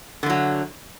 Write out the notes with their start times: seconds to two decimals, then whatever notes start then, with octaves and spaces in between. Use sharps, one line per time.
0.23 D3
0.26 A3
0.30 F#3